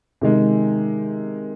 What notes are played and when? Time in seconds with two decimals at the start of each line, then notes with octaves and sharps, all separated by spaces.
0.21 C3 D#3 G#3